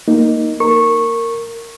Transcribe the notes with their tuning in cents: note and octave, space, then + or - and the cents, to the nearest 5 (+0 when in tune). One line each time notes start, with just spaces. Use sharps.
A#3 +0 D#4 +0
A#4 -15 C#6 -10